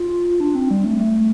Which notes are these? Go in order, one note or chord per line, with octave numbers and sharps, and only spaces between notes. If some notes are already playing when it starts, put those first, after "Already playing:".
Already playing: F4
D4
C4
G3
A3
A3